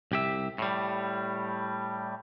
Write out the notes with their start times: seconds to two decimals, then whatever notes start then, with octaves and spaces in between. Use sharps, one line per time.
0.12 C2 G4 E5
0.58 A2 G3